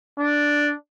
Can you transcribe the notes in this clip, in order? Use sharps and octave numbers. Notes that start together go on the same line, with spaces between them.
D4